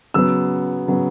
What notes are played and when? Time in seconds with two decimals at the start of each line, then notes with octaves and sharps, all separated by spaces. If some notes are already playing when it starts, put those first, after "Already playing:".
0.14 C#3 F#3 B3 E6
0.87 C#3 F#3 B3